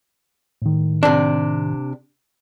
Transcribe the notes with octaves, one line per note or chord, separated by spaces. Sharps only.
A2 D#3
C3 D4